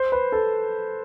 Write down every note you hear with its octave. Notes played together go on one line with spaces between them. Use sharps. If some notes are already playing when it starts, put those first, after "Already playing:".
Already playing: C5
B4
A4